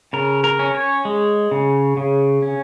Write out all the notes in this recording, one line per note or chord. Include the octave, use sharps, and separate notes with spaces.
C#3 A#4
A#4
C#4
C#5
G#3
C#3
C#3
C#4